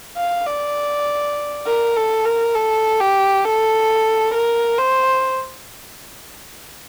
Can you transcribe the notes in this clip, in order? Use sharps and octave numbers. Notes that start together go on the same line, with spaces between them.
F5
D5
A#4
A4
A#4
A4
G4
A4
A#4
C5